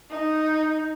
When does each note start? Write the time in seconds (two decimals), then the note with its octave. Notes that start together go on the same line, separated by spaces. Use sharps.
0.11 D#4